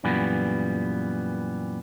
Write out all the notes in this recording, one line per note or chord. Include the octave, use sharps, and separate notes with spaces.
F#2 A#2 E3 G3 B3